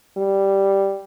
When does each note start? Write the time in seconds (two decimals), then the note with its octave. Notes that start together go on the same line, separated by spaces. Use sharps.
0.17 G3